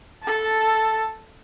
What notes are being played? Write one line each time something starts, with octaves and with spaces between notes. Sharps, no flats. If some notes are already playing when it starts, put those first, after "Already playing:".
A4 A5